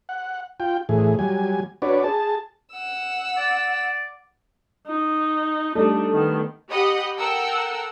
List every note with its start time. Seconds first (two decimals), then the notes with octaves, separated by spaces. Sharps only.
0.09 F#5
0.60 F4 G5
0.89 A2 E3 G#4
1.19 F#3 G3 G#5
1.82 D4 F#4 B4 C#5 D5
2.04 G#4 A5
2.73 F#5 E6
3.37 D5
4.87 D#4
5.75 G3 A3 D4 D#4
6.13 D#3 B3
6.70 G4 D#5 F#5 B5 D#6
7.18 A4 A#4 F#5 G5 E6